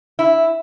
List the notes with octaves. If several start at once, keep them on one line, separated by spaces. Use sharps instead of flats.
E4